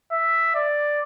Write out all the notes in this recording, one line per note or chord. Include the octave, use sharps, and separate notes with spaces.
E5
D5